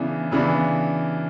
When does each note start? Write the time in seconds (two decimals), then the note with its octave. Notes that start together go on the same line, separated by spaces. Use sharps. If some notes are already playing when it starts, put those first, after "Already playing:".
Already playing: C#3 E3 B3 D4
0.31 C#3 E3 B3 D4